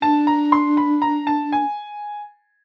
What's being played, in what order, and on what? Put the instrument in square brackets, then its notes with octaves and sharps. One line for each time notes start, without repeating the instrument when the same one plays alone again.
[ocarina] D4 [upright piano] A5
[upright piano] A#5
C6
B5
A#5
A5
G#5